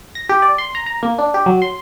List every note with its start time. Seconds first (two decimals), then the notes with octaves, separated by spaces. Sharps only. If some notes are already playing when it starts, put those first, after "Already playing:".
0.15 A#6
0.29 G4
0.42 D5
0.58 C6
0.75 A#5
0.86 A#5
1.03 A#3
1.18 D4
1.34 G4
1.46 F#3
1.62 C6